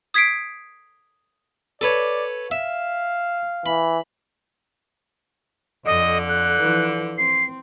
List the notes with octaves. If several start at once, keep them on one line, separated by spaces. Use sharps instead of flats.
D#6 G#6 B6 C7 D7
A4 B4 C#5 D5
E5 F5
E3 B5
F2 D3 D#5
F#6
E3 F3
C4 C7